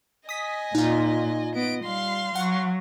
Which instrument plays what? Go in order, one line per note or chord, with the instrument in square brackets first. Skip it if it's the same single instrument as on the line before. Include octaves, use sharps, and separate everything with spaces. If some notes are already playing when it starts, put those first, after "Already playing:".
[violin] D#5 G#5 [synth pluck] D#6 B6
[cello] A#2 [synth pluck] D#4 F4
[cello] B3 [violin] D#5 D7
[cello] G3 [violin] F5 C6
[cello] F#3 [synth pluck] F#5 C#6